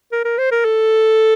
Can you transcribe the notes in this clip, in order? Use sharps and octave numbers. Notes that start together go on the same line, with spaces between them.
A#4
A#4
C5
A#4
A4